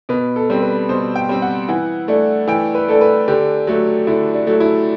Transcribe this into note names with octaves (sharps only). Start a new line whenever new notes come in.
B2 B4
A4
G3 C4
B4
B2 C5
G5
G3 C4
F#5
E3 F#5
A3 D4
E3 G5
B4
A3 D4 A4
B4
D3 G4
F#3 A3
D3 E4
D4
F#3 A3
E4